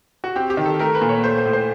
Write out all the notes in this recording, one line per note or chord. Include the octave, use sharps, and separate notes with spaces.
F#4
C4 G4
G4
D#3
A4
A3 A#4
B4
A#2
C#5
A3 C5
C5
A2
C5